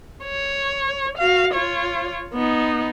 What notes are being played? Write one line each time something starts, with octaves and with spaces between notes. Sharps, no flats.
C#5
F#4 F5
F4 C#5
B3 D#4